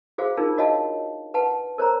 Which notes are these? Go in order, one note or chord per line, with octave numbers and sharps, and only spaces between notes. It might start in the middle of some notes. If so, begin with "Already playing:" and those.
F#4 G#4 C5 F5
D4 D#4 F4 G#4 A#4
F#4 C#5 D#5 F5 A5
B4 F#5 A5
A#4 C5 C#5 A#5